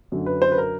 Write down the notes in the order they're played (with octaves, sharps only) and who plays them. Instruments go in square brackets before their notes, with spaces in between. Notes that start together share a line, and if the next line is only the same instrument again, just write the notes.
[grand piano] F#2 D3 F#3
B4
C5
B4
A#4